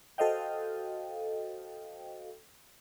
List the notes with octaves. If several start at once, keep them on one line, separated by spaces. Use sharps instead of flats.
F#4 A4 C5 D#5 F5 G5